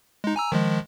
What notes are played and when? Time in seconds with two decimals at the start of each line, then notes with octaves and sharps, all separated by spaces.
0.24 G#3 D#4
0.36 G#5 A#5 E6
0.52 D#3 F3 G#3